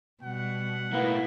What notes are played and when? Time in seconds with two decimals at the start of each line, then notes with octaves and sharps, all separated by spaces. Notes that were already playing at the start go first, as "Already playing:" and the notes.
0.23 B2 G3 F#5
0.93 A2 A#3 B3 E4